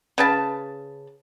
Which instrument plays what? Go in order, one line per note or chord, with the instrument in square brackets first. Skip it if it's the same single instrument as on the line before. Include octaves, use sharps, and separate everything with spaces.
[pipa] C#3 B4 A5